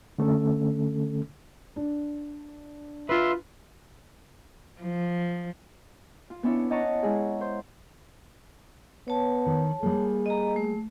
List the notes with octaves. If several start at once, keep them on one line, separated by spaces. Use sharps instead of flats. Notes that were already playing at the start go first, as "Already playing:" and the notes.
D3 A3 C#4 A4
D4
F4 B4 E5 C6
F3
F4
B3 C#4 D4 E4 C#5
C#5 D#5 F#5 A5 A#5 C#6
G#3 E4 G#4
C5
B3 C#5 A5
D#3
G3 A#3 G#4
D#5 A#5
A3